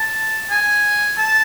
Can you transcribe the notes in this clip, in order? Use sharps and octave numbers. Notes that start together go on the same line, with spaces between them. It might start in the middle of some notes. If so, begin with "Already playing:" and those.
Already playing: A5
G#5
A5